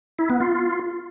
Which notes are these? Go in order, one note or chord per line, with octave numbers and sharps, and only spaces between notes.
E4
B3
F4